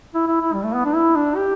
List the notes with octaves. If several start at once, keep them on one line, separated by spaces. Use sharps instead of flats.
E4
E4
E4
G3
A3
B3
D4
E4
D4
G4